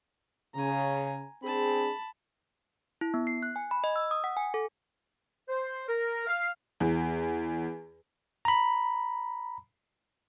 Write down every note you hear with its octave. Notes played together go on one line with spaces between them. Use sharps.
C#3 G#5 A#5
C4 D4 G#4 A5 B5
E4
B3
C7
F#6
G#5
B5
D#5
E6
D#6
F#5
G#5
A4
C5
A#4
F5
E2
A#5 B5